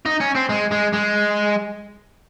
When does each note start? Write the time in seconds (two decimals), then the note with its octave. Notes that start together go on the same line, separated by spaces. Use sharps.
0.06 D#4
0.21 C#4
0.35 C4
0.50 G#3
0.72 G#3
0.94 G#3